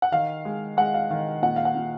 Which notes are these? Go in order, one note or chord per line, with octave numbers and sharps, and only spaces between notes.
F#5
D#3 F5
G#3
G#3 F#5
F5
D#3 F5
A#2 F#5
F5
F#5
A#2